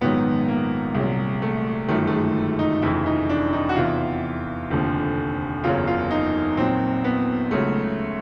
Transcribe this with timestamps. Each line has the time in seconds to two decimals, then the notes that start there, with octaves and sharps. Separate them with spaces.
0.01 A#1 G#2 D#3 F#3 B3
0.48 A#3
0.94 C2 A#2 F#3 G#3
1.42 A3
1.88 G1 F#2 D#3 A3
2.07 A3
2.12 G#3
2.59 D#4
2.82 F1 F2 C#3 E3 E4
3.06 D#4
3.29 D4
3.53 D#4
3.69 F#4
3.76 E2 C3 E3 F4
4.70 F1 D#2 D3 F3
5.63 F#1 E2 C#3 F#3 F4
5.87 F4
6.10 D#4
6.57 A#1 A#2 F#3 C4
7.04 B3
7.51 C#2 C#3 F#3 A3